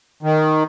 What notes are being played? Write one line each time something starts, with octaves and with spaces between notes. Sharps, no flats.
D#3